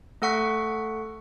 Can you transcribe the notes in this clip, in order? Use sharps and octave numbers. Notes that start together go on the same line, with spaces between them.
A3 A4 F#5 C#6 B6